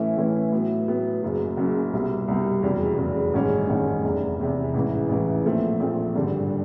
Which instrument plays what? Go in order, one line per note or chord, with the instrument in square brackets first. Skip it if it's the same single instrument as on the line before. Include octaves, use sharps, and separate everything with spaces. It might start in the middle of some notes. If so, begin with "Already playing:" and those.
Already playing: [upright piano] A2 E3 A3 C#4 E4
A2 E3 A3 C#4 E4
A2 F#3 B3
A2 F#3 B3
F#1 F#2 C#3 F#3
F#1 F#2 C#3 F#3
C2 B2 G3
C2 B2 G3
F1 E2 C#3 F#3
F1 E2 C#3 F#3
A1 G2 D#3 G#3 C#4
A1 G2 D#3 G#3 C#4
F1 E2 C3
F1 E2 C3
A1 G#2 E3
A1 G#2 E3
A#1 A#2 F3 A3 C4
A#1 A#2 F3 A3 C4
G#1 G2 D3 G3